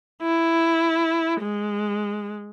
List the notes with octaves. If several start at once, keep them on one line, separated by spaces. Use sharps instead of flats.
E4
G#3